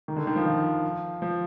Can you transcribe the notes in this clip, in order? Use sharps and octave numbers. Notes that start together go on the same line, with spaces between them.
D#3
D3
D#3
F3
F3
F3